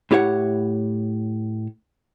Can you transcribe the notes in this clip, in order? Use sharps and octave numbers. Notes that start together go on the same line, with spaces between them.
A2 E4 G4 C#5 E5 F#5